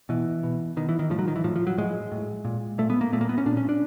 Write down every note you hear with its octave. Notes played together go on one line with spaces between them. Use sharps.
B2 E3
B2
B2 D#3
E3
D#3
A2 F3
F#3
D#3
E3
A2 F3
F3
F#3
A2 G#3
A2
A#2
A#2 A3
B3
A#3
A#2 A3
A#3
B3
C#4
A#2 D4
C#4
D4